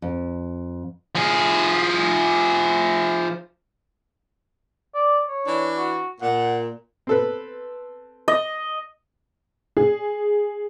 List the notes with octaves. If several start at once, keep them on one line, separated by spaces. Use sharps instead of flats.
F2
F3 G#4
D5
C#5
E3 D4
F#4
A#2 F#5
C4 A4 B4
D#5
G#4